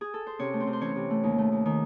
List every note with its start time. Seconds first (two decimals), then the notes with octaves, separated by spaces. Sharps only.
0.01 G#4
0.14 A4
0.27 C5
0.39 C3 C#4 C#5
0.53 A3
0.60 C4 C5
0.67 C3
0.73 C5
0.81 E3 C#4 C#5
0.96 C3
1.10 A3
1.23 D#2
1.38 A3
1.52 D#2
1.66 D#3